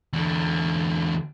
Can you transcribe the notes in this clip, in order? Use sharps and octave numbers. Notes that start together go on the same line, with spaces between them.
E2 D3